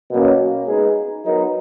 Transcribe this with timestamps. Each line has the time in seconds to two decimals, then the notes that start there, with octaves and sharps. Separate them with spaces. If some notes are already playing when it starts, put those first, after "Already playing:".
0.11 B2 F#3 A#3 C#4
0.68 G#3 B3 D#4 G#4
1.26 F#3 B3 D#4 A#4